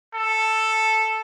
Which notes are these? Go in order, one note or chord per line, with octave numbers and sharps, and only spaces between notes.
A4